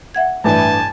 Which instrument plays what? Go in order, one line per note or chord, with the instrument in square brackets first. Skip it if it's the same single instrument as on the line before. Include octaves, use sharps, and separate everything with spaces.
[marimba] E5 F#5 G#6
[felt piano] A1 G2 [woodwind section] E3 [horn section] G#5 A5